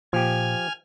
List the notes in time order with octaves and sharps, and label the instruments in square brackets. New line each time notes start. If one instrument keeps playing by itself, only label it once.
[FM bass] A#2 [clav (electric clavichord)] F3 G4 [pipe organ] G#5 F6